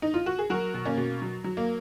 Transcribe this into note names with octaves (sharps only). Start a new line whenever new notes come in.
D#4
F4
F#4
G#4
F#3 F#4 A#4
B2
A#3 C#4
B2
F#3
F#3
A#3